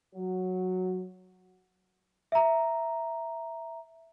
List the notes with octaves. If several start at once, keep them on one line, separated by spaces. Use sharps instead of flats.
F#3
E5 A#5